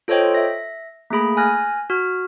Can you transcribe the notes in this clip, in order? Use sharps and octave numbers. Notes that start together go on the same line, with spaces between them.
F4 A4 C5 C#5 D#5 G5
E5 A#6
A3 A#3 G#4 B5
G#5 F6 F#6 A#6
F#4 F6